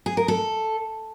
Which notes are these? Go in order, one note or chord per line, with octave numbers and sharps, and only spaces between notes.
G#4
A#4
A4